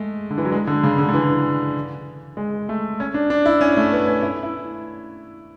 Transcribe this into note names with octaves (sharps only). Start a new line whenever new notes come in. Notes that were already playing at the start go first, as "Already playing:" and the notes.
Already playing: G#3 A3
D3
E3
F#3
G#3
D3
C#3
D3
D3
E3
G#3
A3
C#4
D4
D4
E4
C#4
A3
B3
C#4
E4
E4